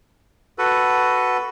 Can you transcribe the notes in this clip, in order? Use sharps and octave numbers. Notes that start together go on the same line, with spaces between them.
F#4 A4 B4